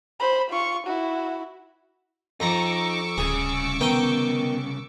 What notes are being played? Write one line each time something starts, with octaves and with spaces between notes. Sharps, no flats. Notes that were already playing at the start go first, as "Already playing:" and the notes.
C5 B5
F4 C#6
E4 F#4
F2 D#4 A#5 C#6 D6 E6
D1 C2 C#3 G#4
D#3 B3 G5